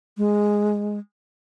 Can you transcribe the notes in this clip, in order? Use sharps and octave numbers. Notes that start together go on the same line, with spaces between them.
G#3